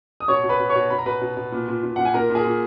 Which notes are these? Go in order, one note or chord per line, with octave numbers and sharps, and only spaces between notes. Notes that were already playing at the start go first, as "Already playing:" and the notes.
D#6
B2 C#5 C#6
B2
B4 B5
B2
C#5 C#6
B2
B2 B5
A#5
B2 B4 B5
B2
B2
A#2
A#2
A#2
A#2 F#5
G#5
A#2 A#4 A#5
A#2
G#4 G#5
A#2